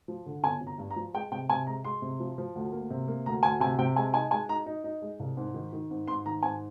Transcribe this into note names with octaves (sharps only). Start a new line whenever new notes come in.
F3
D3
G1 G#5
G1
A#5
G2
A#5
F3
G#3 G5
C3 G5
C3 G#5
G#3 A#5
G#3 C6
C3
F3
F3
D2
A#3
C3
A#3
D2 A#5
D2 G#5
C3 G#5
C3 G5
G#3 G#5
D#4 G#5
G#3 G#5
D#4 A#5
D#4
D#4
G#3
C2
G#2
D#3
D#3
G#2
G#2 C6
D#3 A#5
G#2 G#5